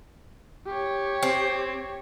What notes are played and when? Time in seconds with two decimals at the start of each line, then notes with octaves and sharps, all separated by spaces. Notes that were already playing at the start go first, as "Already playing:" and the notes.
0.66 G4 C#5
1.23 C4